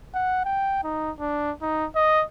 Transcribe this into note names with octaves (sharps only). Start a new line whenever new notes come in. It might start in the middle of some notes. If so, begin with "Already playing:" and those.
F#5
G5
D#4
D4
D#4
D#5